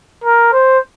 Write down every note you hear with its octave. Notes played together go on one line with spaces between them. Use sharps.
A#4
C5